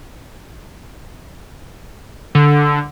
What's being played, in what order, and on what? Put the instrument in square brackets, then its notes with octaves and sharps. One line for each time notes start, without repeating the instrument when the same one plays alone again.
[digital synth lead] D3